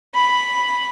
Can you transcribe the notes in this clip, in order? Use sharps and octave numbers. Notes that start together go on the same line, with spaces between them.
B5